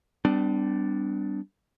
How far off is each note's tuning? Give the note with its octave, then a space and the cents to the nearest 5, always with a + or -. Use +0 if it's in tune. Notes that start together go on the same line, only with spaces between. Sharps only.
G3 +0 B3 +45 D4 +0